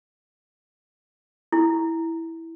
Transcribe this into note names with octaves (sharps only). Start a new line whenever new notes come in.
E4